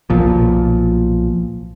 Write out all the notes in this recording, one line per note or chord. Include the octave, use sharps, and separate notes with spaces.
B1 A#2 F3